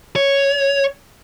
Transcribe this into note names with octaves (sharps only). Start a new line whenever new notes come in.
C#5